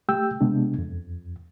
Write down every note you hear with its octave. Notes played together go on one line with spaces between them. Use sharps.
A3 G4 G5 E6 G6
C3 G#3 B3 D4
F2